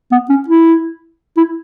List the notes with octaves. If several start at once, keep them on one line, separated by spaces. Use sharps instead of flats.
B3
C#4
E4
E4